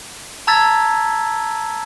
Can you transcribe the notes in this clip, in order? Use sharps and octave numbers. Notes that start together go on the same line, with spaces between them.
A5 A#5 E6 G#6 A6 B6